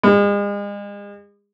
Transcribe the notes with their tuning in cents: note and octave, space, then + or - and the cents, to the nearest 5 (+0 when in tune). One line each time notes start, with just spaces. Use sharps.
G#3 -40